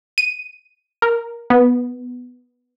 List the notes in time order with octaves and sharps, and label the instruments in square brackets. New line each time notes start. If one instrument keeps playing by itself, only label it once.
[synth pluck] D#7
A#4
B3